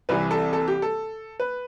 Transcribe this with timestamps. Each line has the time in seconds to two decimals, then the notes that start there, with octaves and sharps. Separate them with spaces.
0.09 C2 C3 E3 B4
0.31 A4
0.53 A4
0.68 G4
0.82 A4
1.40 B4